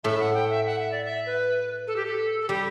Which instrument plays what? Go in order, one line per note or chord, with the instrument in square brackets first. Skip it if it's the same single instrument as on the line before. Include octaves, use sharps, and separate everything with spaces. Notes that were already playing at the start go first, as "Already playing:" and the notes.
[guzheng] A2 A3 [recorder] E5
[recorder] F#5
G5
E5
F#5
E5
D5
E5
B4
A4
G4
A4
A4
[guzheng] G3 [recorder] G4